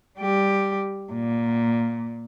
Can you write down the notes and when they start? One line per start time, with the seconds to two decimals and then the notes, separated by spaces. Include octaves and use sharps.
0.19 G3 G4
1.12 A#2